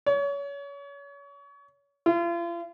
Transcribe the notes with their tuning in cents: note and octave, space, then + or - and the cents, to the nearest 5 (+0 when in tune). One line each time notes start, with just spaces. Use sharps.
C#5 +30
F4 -40